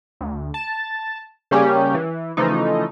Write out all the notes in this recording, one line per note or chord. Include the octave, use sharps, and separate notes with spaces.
D2
A5
C#3 G3 A#3 C#4 G4
E3
C#3 E3 F3 A3 D#4